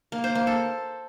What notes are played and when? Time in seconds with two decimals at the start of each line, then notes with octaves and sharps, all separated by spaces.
0.12 A#3
0.24 C5
0.35 A#3
0.47 A4